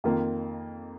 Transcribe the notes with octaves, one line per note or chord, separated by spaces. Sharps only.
F2 D#3 A#3 F4